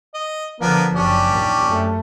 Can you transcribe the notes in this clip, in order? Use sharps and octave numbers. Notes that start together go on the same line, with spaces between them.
D#5
D3 F3 A#3 B3 D4
F#1 C#4 D4 G4
D#2 A#2
F#2 A3